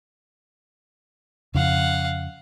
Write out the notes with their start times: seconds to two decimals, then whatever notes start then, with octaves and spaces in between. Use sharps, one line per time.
1.55 F2 C#3 D4 F5 F#5